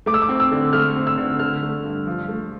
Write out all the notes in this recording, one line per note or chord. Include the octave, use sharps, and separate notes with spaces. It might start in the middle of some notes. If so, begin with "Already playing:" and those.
A3 D6
E6
D6
C4
E6
D3
A3 F6
C4
E6
D3
D3 F6
A3
G2
F3
A3